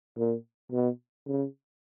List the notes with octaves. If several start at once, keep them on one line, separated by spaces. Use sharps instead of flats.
A#2
B2
C#3